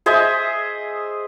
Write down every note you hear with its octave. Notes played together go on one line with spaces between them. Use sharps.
G#4 C5 D#5 E5